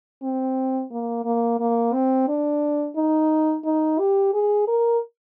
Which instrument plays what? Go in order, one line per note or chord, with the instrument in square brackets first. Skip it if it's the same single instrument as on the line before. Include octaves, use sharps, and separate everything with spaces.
[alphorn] C4
A#3
A#3
A#3
C4
D4
D#4
D#4
G4
G#4
A#4